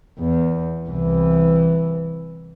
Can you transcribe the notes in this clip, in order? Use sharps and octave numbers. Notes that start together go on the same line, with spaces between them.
E2
C2 E3